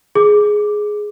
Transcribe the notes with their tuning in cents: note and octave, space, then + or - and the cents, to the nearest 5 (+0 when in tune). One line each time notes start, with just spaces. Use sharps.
G#4 +10 D6 +0